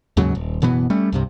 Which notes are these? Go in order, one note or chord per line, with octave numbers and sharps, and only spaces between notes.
D#2 G#2 C#3 F#3
D#1
F#1 B2 E3 B3
G3 A3 C#4
C2 G2 C3